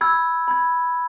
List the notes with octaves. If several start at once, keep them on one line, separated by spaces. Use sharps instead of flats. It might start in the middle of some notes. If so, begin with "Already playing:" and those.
B5 E6 G#6
B5 E6 G#6